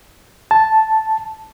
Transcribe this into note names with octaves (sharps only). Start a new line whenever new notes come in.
A5